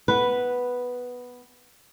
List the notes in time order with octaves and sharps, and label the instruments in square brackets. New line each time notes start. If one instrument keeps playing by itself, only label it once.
[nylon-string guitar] B3 B4